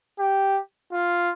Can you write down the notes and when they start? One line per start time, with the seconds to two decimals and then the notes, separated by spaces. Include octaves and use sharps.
0.20 G4
0.93 F4